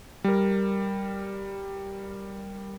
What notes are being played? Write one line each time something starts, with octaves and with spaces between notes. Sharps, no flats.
G3 A#4